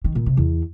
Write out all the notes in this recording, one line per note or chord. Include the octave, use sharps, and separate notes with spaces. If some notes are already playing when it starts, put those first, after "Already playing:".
D#3
A#2
C3
E2